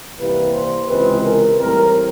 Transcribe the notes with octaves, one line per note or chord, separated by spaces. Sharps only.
C2 C3 E3 G3 A#3 B4
C5
C#2 C3 E3 G#3 C4 B4
A#4
A2 E3 G3 C4 A#4